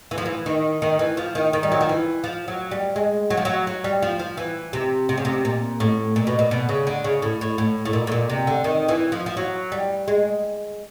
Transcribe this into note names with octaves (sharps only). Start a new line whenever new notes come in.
E3
F3
E3
D#3
D#3
E3
F3
D#3
D#3
G3
F#3
F3
E3
F3
F#3
G3
G#3
F#3
F3
F#3
F#3
G3
F3
F3
E3
C3
C3
C#3
C3
A#2
A2
A#2
B2
A#2
B2
C#3
D3
C#3
A2
A2
A2
A2
A#2
A2
A#2
C3
D3
D#3
E3
F3
F3
F#3
G3
G#3